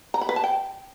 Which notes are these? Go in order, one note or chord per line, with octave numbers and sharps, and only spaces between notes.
A#5
B5
B4
A5
G5